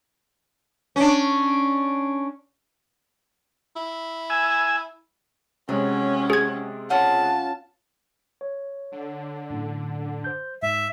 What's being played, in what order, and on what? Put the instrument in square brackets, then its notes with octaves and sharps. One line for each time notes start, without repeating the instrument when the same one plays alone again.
[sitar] C#4 D4
[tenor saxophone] E4
[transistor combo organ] G#5 E6
[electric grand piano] C3 G#3 [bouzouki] F#3 [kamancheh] C#4
[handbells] G#4 G#6
[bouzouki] C#4 F4 F#5 [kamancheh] A5
[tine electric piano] C#5
[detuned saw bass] D3
[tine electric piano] F#2 A2
C5 G6
[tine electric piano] G#2 [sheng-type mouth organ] E5